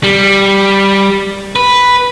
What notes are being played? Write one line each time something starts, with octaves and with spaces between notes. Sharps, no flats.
G3
B4